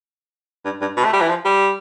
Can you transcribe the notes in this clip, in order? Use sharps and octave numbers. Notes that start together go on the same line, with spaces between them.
G2
G2
B2
A3
G3
E3
F3
G3